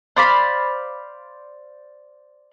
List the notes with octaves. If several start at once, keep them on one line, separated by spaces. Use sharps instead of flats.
C5 D5 F5 B5